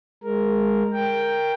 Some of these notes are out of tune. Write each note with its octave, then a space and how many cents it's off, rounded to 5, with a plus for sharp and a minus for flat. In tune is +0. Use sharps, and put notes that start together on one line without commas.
G#3 -10 A#4 +0
A#4 +0 G5 +5